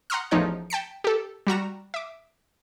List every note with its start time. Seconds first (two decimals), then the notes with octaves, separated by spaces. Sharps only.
0.10 F#5 A#5 C6 D#6 F6
0.31 A1 E2 F3 D#4 C#5 F#6
0.70 G5 A5 B6 C#7
1.04 G4 A4
1.47 G3 F#4 A#5 E7
1.94 E5 D6